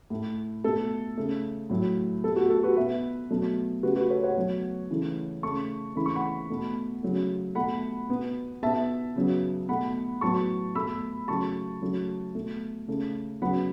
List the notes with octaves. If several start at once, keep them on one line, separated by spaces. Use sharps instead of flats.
A2 A3
B2 A3 A4
C#3 A3
A2 F#3 A3
B2 A3 A4
F#4
A4
F#4 B4
B2 B3 B4 E5
B2 F#3 A3
C#3 A3 F#4 B4
F#4 B4
A4 C#5
C#5 F#5
B2 F#3 A3
C#3 E3 A3
C#3 A3 A5 C#6
C#3 E3 A3 B5
C#6
F#5 B5
B2 A3
C#3 F#3 A3
B2 A3 F#5 B5
B2 B3
B2 B3 E5 A5
C#3 F#3 B3
B2 A3 F#5 B5
A2 F#3 B3 A5 C#6
B2 A3 B5 E6
C#3 F#3 A3 A5 C#6
C#3 F#3 A3
B2 A3
C#3 A3
C#3 F#3 B3 F#5 B5